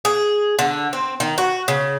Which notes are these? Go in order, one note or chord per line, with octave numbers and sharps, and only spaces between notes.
G#4
D3
C4
D#3
F#4
C#3